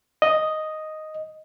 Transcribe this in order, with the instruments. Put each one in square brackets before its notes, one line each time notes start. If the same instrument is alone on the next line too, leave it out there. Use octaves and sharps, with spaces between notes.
[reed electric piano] D#5